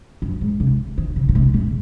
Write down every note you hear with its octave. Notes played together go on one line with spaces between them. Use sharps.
F#2
G#2
C3
D#3
C#3
A#2
C3
A#2